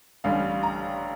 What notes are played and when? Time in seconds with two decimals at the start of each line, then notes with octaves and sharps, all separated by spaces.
0.24 A1 G2 D3 G3 F5
0.63 A#5